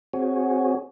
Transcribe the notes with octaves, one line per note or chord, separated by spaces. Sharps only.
C4 F#4 G#4 C#5